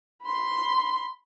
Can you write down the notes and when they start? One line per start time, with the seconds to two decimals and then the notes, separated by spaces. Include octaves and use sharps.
0.24 B5 C6